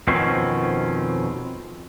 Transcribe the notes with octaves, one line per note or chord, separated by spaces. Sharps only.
F2 B2 D#3 C4 C#4